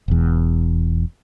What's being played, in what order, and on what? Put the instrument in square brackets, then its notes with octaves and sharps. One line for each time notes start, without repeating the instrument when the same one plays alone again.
[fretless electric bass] E1 E2